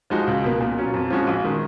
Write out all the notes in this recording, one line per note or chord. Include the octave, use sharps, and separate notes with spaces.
F3 G#3 D#4 F#4
C#2
B2 A#3
A#2
F#3 C#4 F4
F2
F3 G#3 C#4 F#4
A#1
D#3 G#3